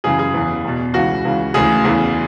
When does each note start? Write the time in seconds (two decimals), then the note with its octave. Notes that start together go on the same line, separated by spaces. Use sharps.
0.04 F#2 C#3 E3 G#4
0.19 G#4
0.34 E2 C#3 E3
0.64 E2 B2
0.94 C#2 C#3 E3 F#4
1.25 C#2 C#3 E3
1.54 D2 C#3 E3 G#4
1.84 E2 C#3 E3